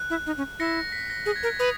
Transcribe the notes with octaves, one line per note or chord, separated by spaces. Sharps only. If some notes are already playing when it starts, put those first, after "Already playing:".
Already playing: F#6
E4
D#4
C#4
E4 A#6 C#7
B6
A#6
G#4 A#6
G#6
A#4 A#6
B4 D#6